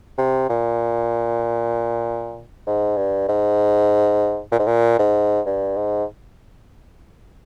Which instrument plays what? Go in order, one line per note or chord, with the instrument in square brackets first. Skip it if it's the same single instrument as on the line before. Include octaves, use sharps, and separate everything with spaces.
[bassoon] C3
A#2
G#2
G2
G#2
A#2
G#2
A#2
G#2
G2
G#2